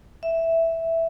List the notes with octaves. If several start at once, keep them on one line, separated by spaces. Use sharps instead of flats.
E5